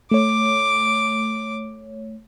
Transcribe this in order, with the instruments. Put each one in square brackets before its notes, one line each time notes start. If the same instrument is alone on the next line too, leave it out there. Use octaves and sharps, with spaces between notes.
[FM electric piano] A3 C#5 [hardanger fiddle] D6